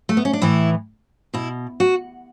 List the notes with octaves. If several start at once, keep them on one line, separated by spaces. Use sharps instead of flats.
A3
B3
C#4
D4
A2 E3 E4
B2 E4
F#4